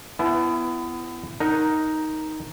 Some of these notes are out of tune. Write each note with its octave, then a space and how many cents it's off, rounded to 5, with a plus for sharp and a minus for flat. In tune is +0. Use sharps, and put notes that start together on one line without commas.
B3 +20 E4 +30 G#5 +45
D#4 +5 A#4 +0 F#5 +0